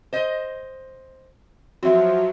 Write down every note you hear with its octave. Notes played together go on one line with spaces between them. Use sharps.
C5 D#5
F3 F#3 C4 F#4 E5